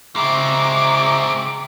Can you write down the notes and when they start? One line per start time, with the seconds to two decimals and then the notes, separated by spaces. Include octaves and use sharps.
0.16 C#3 G#3 C4 E5 A#5 C#6 D6